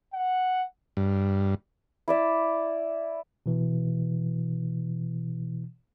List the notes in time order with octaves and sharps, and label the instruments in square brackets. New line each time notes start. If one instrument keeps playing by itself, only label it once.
[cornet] F#5
[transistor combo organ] G2
[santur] E4 D5 E5
[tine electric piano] B2 E3